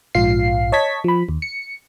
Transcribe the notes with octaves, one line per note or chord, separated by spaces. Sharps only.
A#1 G#2 F4 F5 C7
C#5 D#5 A5 C#6 G#6 B6
F3 B5
D#2
C#7